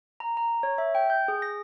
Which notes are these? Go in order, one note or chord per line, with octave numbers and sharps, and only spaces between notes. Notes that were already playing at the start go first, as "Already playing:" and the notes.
A#5
A#5
C#5
E5
G5
G6
G#4
A#6